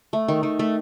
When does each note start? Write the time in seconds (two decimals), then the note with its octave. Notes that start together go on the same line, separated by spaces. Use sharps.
0.13 A3
0.28 D#3
0.43 D#3
0.59 A3